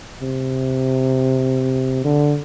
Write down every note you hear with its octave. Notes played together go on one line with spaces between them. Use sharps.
C3
D3